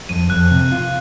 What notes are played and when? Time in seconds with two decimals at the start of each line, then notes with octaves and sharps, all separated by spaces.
0.09 F2 D#7
0.30 F2 F#6
0.51 C3
0.72 F4